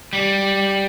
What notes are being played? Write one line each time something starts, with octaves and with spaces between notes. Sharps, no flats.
G3